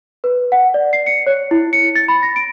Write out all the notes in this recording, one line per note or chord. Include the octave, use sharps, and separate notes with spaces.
B4
F#5
D5
C7
C#7
C#5
E4
C#7
A6
B5
A#6
D7